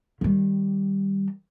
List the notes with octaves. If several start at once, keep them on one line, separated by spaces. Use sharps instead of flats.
D#3 G3